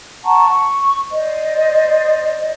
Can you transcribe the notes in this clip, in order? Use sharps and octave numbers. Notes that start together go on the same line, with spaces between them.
F#5 A5 A#5 C#6
C#6
C5 D5 D#5